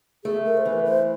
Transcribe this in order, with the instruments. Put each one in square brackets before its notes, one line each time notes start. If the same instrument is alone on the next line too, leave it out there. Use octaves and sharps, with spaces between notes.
[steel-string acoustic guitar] A3 [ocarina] G#4
[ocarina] A#4
C5
[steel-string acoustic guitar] E3 [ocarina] B4
[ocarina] C5